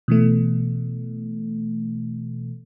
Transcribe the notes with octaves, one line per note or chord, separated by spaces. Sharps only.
B2 E3 A3